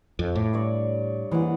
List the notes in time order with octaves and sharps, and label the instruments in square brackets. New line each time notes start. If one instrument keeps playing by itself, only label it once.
[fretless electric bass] F2
[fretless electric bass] A2 [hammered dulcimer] D6
[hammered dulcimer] G2 C#5 D5
[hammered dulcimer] G#2 F#5 [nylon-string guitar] E3 A#3